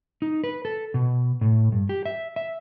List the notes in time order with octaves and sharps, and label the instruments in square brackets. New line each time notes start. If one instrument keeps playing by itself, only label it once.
[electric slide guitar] D#4
B4
A4
B2
A2
G2
G4
E5
E5